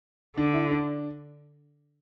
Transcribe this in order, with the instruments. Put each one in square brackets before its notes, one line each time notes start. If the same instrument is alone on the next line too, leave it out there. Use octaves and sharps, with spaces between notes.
[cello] D3 [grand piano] D4
[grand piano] E4
D4